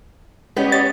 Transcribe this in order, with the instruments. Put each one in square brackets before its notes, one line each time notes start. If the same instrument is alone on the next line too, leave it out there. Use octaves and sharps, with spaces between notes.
[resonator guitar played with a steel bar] G3 B3 [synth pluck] G#3 C#4 [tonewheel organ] G4 C#5 D#5
[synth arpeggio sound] A6